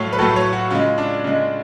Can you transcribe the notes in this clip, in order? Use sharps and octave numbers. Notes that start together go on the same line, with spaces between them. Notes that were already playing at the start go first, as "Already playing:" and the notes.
Already playing: A2 F#3 A3 C#5 F5
B4
A2 F#3 A3 A4
C#5
F#4
C#3 G#3 F4
D4
C#3 G#3